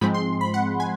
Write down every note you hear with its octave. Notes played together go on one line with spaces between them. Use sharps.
G#2 F3 G#3 C4 B5
C6
B5
F#5
G#5